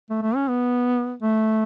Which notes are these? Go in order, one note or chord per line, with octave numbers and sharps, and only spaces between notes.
A3
A3
C#4
B3
A3